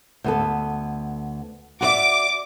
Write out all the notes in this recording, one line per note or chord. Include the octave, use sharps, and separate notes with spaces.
D2 B3 A4
F#4 D5 E5 D6